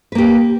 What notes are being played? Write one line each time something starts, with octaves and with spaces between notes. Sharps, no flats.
A#3 G4 B4